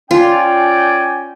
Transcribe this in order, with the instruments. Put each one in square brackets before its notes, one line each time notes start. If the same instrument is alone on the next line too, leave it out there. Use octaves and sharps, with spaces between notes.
[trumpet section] C#4 D5 G5 [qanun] F4 [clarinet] G#5